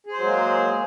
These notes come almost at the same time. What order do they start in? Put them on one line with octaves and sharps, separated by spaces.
G#4 C5 F#3 G#3 A#3